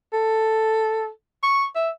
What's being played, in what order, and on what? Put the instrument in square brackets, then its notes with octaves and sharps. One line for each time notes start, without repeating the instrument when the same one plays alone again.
[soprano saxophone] A4
C#6
E5